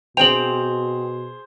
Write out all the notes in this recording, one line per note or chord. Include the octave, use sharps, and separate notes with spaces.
B2 C4 G#4 C5 G5 F7 F#7